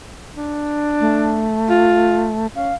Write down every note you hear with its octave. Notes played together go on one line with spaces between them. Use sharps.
D4
A3
F4
C#4 F5